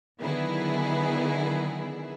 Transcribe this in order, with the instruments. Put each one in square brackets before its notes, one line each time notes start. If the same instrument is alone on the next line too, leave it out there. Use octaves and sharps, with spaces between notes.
[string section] D3 D#3 F#3 B3 E4 G#4